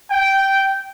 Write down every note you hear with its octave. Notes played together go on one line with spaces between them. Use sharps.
G5